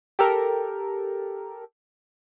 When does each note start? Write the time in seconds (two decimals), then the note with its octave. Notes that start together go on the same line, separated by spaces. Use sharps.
0.19 G4 A4 A#4